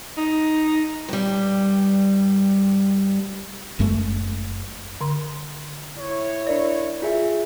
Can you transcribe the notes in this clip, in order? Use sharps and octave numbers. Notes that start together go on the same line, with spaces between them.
D#4
G2 G3
F#1 F#2 G#3 A3
D3 C6
E4 C#5
D4 A#4 D5
F4 G#4 E5